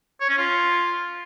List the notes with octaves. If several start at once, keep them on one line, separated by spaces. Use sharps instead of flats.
C#5
C#4
F4